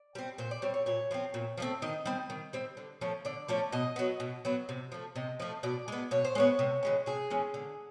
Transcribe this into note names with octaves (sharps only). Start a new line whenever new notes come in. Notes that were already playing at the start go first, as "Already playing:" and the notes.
Already playing: D5
G3 C4
A#2 C5
D5
G3 C4 C#5
C#5
A#2 C#5
F3 A3 C4
A#2
F3
A3 C4
D#3 D#5
G3 C4
D#3
G3 C4
D3
F3 A3 C#4
D3 D5
F3 A3 C#4
B2 D#5
F#3 B3
B2
F#3 B3
C3
F3 A3
C3 D#5
F3 A3
B2 D5
G#3 B3
B2 C#5
C5
G#3 B3 C#5
C3
E3 G#3 C#4
C3 G#4
E3 G#3 C#4
D3